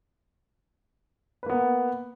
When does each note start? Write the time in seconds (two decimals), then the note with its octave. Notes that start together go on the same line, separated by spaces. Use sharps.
1.43 B4
1.46 A#3
1.50 B3